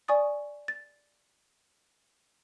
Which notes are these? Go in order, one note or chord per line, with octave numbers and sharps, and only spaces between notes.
D5 G#5 C#6 D#6 A6
A6